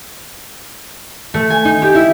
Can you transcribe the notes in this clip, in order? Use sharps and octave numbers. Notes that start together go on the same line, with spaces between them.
A3
G#5
D#4
G4
E4